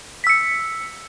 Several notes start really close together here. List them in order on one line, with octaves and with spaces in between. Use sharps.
B6 E6 C#7